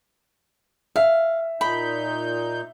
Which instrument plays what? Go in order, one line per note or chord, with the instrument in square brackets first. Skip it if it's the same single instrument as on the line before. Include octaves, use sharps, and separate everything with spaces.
[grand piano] E5 [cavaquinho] F5
[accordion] A#2 D#4 G6 [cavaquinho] B5